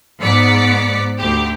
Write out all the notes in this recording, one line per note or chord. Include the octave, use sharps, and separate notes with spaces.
G#2 B3 D5 B6 C#7
D2 G4